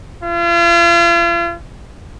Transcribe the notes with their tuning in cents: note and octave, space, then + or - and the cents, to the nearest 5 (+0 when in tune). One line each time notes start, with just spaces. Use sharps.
F4 -40